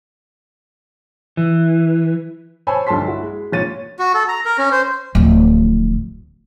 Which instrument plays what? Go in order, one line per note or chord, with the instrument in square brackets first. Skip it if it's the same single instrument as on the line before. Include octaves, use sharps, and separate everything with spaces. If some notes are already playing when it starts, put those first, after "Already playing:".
[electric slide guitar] E3
[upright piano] C5 C#5 G#5 A5 B5 E6
B1 G2 D3 A5 C6 B6
E4 F#4
G#3
G#1 A#2 C#5 A6 D#7
[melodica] F#4
A4
A#5
A#4
C#4
C5
[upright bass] D1 F3